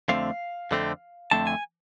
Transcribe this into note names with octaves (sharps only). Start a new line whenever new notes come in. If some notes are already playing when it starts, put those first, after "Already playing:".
F2 D3 A3 C4 F5
F2 D3 A3 C4
F2 D3 A3 C4 A5
G#5